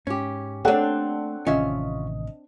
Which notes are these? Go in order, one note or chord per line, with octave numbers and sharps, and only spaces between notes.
G#2 C#4 G4
A3 A#3 C4 D4 A4 C#5 F#5
A1 C3 D#3 C#4 F4 D#5 E5